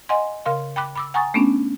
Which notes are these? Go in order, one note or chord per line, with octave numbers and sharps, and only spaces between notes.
D#5 F#5 G#5 C6
C#3 A#4 F5 C6
G5 B5 D6 F#6
B5 D6 E6
F#5 G#5 A#5 C#6 D#6 A6
A3 B3 C#4 D4